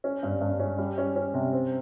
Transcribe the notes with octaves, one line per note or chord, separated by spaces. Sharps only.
C#4
G2
G2
C#4
G3
C#4
C#4
C3
C4